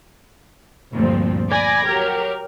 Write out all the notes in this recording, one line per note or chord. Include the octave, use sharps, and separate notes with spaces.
D2 G2 A#2 F3 C4
D5 G#5 B5 D6 G#6 A#6
F#3 G4 A#4